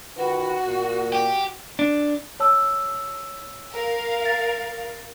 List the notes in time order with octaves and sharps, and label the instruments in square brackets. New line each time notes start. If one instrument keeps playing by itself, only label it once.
[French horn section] D#3 F4 B4 [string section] F#4
[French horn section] A#2 A#3
[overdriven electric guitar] G4
[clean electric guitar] D4
[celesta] C#5 A5 E6
[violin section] A#4 F5
[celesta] A6